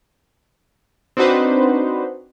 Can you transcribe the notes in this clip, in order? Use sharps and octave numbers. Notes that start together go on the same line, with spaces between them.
C4 D4 D#4 F#4 B4 C5